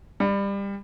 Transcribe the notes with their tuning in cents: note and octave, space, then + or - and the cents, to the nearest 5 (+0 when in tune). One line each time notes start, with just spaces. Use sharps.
G3 +25